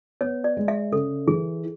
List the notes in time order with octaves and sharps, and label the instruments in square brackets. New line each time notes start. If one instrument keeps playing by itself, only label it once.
[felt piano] B3 [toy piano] C#5
[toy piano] D5
[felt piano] G#3
[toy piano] E5
[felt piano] C#3 [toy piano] A4
[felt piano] E3 [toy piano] G#4